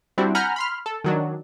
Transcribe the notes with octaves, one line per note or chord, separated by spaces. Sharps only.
G3 C4 D4 E4 F#4
F#5 G#5 A#5 B5 F6 G6
B5 C6 F6
A4
D#3 F#3 D4